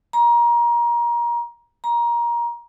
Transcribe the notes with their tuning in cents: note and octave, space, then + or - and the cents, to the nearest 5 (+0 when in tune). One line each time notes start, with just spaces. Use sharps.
A#5 +25
A#5 +20